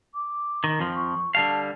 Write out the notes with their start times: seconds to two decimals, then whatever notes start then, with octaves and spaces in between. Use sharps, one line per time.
0.14 D6
0.64 D#3
0.79 F2 F3
0.95 C#6
1.35 D3 G3 F5 A5